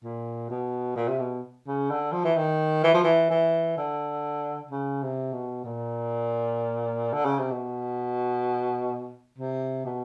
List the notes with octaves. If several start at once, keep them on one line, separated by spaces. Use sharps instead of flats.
A#2
B2
A#2
C3
B2
C#3
D3
F3
E3
D#3
E3
F3
E3
E3
D3
C#3
C3
B2
A#2
D3
C#3
C3
B2
C3
B2